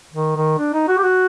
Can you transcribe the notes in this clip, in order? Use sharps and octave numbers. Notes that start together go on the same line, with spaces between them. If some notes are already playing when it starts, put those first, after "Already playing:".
D#3
D#3
D4
D#4
F#4
G4
F#4